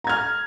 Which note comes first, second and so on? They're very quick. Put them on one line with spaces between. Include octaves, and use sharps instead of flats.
A#5 G#6 F6